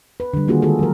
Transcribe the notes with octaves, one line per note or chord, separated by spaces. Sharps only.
B4
D3 G3
D#3 A#3 F4 F#4 G#4
D#3 G#3 F4 F#4 G#4 A4
F#3 A#4